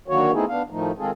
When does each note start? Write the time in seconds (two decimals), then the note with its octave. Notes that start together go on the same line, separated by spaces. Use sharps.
0.08 D3 D#3 F#3 A#3 F#4 C#5
0.33 A3 B3 C4 D#4 E4 G#4
0.49 B3 D4 F5
0.70 A2 D#3 F3 A3 D#4
0.98 D#3 G#3 C4 F4 G#4 A4